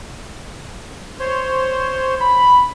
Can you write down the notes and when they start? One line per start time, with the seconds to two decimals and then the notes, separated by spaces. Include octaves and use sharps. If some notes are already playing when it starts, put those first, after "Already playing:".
1.20 C5 C#5 C6
2.20 B5